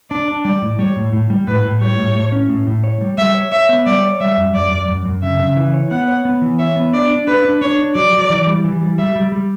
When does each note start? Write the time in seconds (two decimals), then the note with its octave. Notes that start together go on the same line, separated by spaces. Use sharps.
0.11 D4 D5
0.28 D4
0.44 G3 D5
0.62 A2
0.79 G3 C#5
0.96 A2
1.13 A2
1.30 G3
1.47 A2 B4
1.64 A2
1.81 G3 C#5
1.98 A2
2.15 A2
2.32 C#4
2.49 A2
2.67 A2
2.84 C#5
3.01 G3
3.18 G3 E5
3.35 C#5
3.52 C#5 E5
3.69 B3
3.86 G3 D5
4.03 C#5
4.20 G3 E5
4.37 F#2
4.54 F#2 D5
4.71 F#2
4.88 F#2
5.05 F#2
5.23 C#3 E5
5.39 C#3
5.56 E3
5.74 C#5
5.91 B3 F#5
6.08 C#5
6.25 B3
6.42 E3
6.59 C#5 E5
6.76 B3
6.93 D4 D5
7.10 D4
7.27 D4 B4
7.45 D4
7.61 D4 C#5
7.79 D4
7.95 F#3 D5
8.13 F#3
8.30 E3
8.47 G3
8.64 E3
8.81 G3
8.98 G3 E5
9.15 G3
9.32 G3